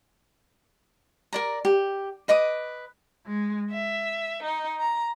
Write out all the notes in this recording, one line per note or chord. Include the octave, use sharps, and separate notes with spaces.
A#4 D5 A#5
G4
B4 D#5 D6 D#6
G#3
E5
D#4
A#5